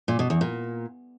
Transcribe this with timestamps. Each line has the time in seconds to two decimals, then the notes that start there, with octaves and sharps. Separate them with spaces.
0.08 A#2
0.19 B2
0.30 E2
0.41 A#2